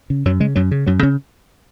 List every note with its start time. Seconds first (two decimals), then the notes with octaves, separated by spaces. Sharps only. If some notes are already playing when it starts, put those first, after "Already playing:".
0.10 C#3
0.25 F#2 F#3
0.40 C#3 G#3
0.56 F#2 F#3
0.71 C#3
0.86 F#2 F#3
1.03 C#3 C#4